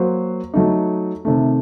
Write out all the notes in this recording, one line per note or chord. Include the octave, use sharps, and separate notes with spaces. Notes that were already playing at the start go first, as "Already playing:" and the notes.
Already playing: F#3 A#3 F#4 C5
F#3 A3 D#4
C3 D#3 A3